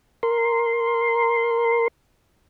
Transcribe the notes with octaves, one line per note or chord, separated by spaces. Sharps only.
A#4 C6